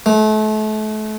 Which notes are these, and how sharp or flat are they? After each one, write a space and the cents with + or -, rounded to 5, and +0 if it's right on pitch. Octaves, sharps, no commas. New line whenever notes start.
A3 -35